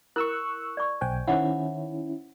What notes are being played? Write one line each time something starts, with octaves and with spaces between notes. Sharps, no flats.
E4 A#4 C#6 E6 F#6
D5 C#6
B1 C5 G5 G#5
D#3 C#4 E4 C5 F#5